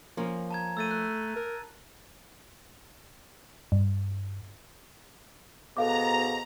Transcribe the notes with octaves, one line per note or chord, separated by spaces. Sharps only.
F3 A#3 C#4
A5 A#5 G#6
A3 E6 A6 D#7
F#6
A#4
G2
G#2 B2 B3 A4 F5 A#5 D6